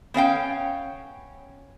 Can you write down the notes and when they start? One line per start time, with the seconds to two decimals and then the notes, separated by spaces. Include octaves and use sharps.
0.14 B3 C#4 F5 G5